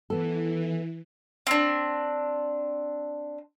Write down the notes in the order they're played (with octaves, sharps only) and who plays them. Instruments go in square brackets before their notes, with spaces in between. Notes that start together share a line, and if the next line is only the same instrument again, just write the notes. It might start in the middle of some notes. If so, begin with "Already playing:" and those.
[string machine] E3 [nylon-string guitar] B3 A4
[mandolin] C4 D4